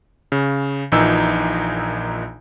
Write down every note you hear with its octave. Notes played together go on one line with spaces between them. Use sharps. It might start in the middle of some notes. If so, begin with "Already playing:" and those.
C#3
A#1 A#2 E3 D#4 E6